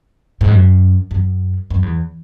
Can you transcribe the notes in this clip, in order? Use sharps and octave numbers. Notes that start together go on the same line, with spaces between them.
G#2
F#2
F#2
F#2
E2